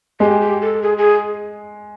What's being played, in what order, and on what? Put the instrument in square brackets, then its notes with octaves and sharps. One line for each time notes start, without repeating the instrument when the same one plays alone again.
[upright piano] G#3 [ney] G4
[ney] G4
A4
G#4
G#4